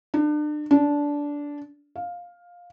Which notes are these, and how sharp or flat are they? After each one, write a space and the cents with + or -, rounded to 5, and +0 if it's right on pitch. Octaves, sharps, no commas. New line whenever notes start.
D4 +35
D4 -15
F5 +10